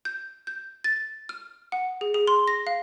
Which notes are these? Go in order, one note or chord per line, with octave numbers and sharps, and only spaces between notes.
G6
G6
A6
F6
F#5
G#4
G#4
C6
A#6
F5